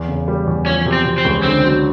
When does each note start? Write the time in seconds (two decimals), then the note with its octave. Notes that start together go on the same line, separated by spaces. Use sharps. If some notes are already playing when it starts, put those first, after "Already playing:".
Already playing: E2
0.09 C#3
0.28 G3
0.47 E2
0.66 F3 C#4
0.86 C3
0.92 C4
1.06 C3
1.18 C4
1.25 C#2
1.43 D3 C4
1.64 F#3